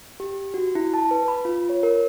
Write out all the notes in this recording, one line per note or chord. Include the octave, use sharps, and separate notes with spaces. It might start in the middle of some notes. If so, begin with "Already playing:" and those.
G4
F#4
E4
A5
B4
B5
F4
C#5
A#4